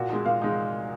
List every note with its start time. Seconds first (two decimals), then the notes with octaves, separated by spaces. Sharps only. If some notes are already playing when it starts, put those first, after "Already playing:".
Already playing: A#2 F#4
0.10 G#3 D#4
0.25 A#2 F5
0.42 G#3 D#4